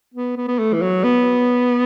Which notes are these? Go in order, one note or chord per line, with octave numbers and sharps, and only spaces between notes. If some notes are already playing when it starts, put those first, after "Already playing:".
B3
B3
B3
A3
E3
F#3
B3